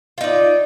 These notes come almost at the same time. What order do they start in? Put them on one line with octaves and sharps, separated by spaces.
F4 D#4 D5